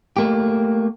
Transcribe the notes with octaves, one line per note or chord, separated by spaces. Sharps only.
A3 A#3 G4